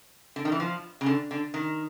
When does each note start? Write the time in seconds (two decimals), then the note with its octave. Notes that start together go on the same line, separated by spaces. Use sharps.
0.36 D3
0.45 D#3
0.52 E3
0.60 F3
1.01 C#3
1.06 D3
1.31 D3
1.54 D#3